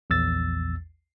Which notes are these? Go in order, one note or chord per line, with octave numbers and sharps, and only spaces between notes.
A#1 E2 E6 A6